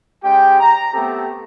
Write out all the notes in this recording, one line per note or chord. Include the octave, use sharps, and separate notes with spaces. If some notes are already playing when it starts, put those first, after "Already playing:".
G#3 C#4 G4 G5
A#5
A3 B3 C4 G4 A4